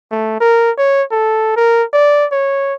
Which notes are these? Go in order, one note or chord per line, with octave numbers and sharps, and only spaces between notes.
A3
A#4
C#5
A4
A#4
D5
C#5